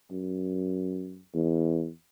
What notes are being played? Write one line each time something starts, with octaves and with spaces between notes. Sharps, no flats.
F#2
E2